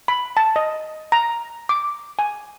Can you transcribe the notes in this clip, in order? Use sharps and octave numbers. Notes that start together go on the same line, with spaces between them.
B5
A5
D#5
A#5
D6
G#5